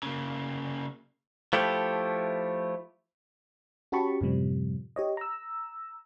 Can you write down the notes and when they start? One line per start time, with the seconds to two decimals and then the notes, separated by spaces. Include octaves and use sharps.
0.03 C#3 A#3
1.53 F3 A3 E4 G4
3.92 C#4 F#4 G4 A5 B5 C#6
4.21 F#2 A2 C3 F3 G3
4.96 G4 C#5 D#5
5.17 A#5 E6